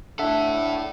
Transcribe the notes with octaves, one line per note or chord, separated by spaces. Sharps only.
D4 E4 A4 E5 F#5